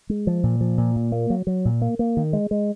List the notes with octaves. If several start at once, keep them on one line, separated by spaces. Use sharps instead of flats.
G#3
F3
A#2
F3
A#2
A#2
A#3
F#3
F#3
A#2
A#3
A#3
D#3
G#3
G#3